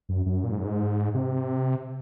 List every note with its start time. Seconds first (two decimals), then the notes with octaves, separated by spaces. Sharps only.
0.09 F#2
0.26 F#2
0.44 A#2
0.51 G#2
0.58 F#2
0.65 G#2
1.14 C3